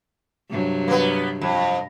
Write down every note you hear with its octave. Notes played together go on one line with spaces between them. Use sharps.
G2 C3 F#3
A#3 B3
F2